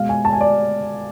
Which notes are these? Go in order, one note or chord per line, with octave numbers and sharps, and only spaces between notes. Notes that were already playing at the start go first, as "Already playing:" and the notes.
Already playing: B2 G#3 F5
G#5
A5
G#5
D5